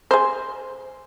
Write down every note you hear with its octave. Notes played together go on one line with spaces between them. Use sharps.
G#4 C5